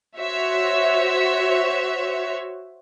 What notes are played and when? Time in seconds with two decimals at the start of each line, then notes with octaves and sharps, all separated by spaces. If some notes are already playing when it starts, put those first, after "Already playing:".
0.18 F#4 C5 C#5 E5